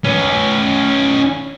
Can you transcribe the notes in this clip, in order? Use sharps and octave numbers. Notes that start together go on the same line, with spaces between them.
C#4 B4